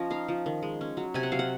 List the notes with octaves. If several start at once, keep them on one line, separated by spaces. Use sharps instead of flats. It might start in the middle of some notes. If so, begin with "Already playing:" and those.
Already playing: F3 C#4 D#5
D#4 F5
F3
D#3
G#3
C#4
F#3
C3 G#5
F#5
F#3 F5
F#5